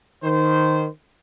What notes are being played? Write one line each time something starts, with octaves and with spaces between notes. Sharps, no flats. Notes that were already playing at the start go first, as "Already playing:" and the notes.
D#3 C5